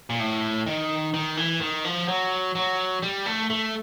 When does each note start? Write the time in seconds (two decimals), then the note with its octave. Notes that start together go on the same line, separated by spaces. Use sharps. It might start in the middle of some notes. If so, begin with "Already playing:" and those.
0.10 A#2
0.20 A2
0.66 D#3
1.14 D#3
1.37 E3
1.61 D#3
1.85 F3
2.08 F#3
2.55 F#3
3.03 G3
3.26 A3
3.50 A3